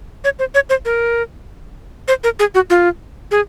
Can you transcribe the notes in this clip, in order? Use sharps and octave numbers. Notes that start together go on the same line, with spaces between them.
C#5
C5
C#5
C5
A#4
C5
A#4
G#4
F#4
F4
G#4